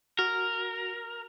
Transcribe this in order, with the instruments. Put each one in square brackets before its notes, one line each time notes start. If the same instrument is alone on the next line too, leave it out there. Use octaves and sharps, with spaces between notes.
[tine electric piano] F#4 [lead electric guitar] A#4